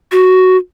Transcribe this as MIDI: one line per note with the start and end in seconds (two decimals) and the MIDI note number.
0.12 0.57 66